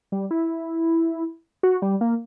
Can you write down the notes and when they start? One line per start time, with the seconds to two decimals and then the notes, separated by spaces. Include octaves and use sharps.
0.12 G3
0.31 E4
1.63 F#4
1.82 G3
2.01 A#3